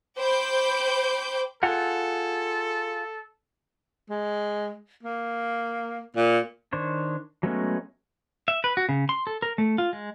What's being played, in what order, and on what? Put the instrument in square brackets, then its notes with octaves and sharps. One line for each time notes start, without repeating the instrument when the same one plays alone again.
[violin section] C5 G5 B5 D6 G6
[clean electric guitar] F4 G#4 F#5 [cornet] A4
[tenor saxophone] G#3
A#3
A#2
[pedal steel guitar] D#3 D4 C5 C#5
F#3 G#3 A3 B3 C#4
E5
B4
F#4
C#3
C6
A4
A#4
A3
F4
G#3